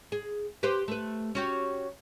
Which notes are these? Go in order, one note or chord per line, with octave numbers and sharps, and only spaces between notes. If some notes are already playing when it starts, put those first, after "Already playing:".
G#4
G4 B4 C5
A3 B4
C#4 F#4 G4